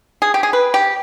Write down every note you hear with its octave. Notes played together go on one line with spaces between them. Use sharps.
G#4
G4
G#4
B4
G4